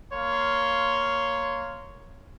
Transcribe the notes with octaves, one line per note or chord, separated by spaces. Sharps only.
A#3 C#5 F5 C6